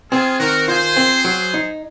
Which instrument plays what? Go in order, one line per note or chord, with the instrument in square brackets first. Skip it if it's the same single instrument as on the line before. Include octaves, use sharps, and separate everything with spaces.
[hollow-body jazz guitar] C4 [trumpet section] F4 G#4
[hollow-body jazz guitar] D#3 [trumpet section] F#4 A#4
[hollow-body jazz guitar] F4 [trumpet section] G#4 C5
[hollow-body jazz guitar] C4
F#3
D#4